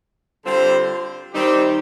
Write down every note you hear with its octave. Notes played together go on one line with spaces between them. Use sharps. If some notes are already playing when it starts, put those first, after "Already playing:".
D3 G3 C4 F4 C5
D#3 G3 C4 D#4 G4